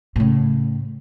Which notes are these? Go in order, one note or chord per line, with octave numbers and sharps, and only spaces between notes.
A2 C#3